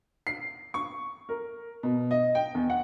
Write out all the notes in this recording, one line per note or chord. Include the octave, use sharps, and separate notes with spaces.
C7
C#6
A#4
B2
D#5
G5
E2
F#5